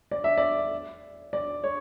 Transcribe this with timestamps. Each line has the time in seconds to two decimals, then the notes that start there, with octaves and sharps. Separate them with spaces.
0.11 D5
0.24 E5
0.38 D5
1.33 D5
1.64 C#5